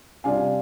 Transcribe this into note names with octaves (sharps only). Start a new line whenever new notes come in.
C3 G3 D4 F4 F5 G#5